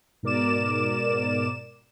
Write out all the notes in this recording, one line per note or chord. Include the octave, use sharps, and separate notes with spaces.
G#2 B2 A#4 D5 D6 E7